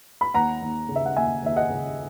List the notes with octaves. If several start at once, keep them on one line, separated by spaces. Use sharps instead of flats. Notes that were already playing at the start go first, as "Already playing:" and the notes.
B5
D#2 F#5 A#5
D#2
C#3
E5
F#5
D#2 E5 G#5
D#2 E5
D#5 F#5
C#3